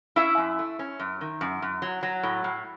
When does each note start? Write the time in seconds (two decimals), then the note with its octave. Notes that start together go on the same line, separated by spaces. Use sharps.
0.16 C#4 E4 E5
0.37 F#2
0.59 A3
0.79 C#4
1.00 F#2
1.21 D#3
1.41 F#2
1.62 F#2
1.82 F#3
2.03 F#3
2.23 A2
2.44 A2